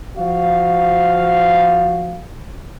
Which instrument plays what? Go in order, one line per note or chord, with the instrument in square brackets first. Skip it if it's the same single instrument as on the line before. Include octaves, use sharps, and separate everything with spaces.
[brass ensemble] F3 F#4 F5